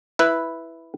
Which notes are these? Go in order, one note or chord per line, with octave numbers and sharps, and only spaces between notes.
E4 B4